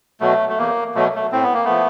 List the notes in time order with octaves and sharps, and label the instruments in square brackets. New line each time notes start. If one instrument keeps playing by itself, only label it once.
[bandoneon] B2 F#3 A3
A3
E2 A#3
B2 F#3 A3
A3
A2 C4
B3
A#3
F3 A3 B3